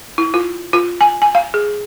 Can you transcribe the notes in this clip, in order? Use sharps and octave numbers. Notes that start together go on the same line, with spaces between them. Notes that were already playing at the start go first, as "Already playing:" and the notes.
E4
F4
F4
G#5
G#5
F5
G#4